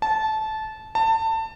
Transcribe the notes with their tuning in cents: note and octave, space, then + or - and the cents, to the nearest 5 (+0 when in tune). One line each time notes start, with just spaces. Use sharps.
A5 -15
A5 +25